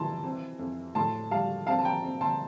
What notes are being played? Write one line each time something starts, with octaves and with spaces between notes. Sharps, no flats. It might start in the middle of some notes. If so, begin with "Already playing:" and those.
Already playing: E3 A5 C6
C4
F2
A2 A5 C6
G3 F5 A5
C4 F5 A5
A5
G5 A#5
C4
A5 C6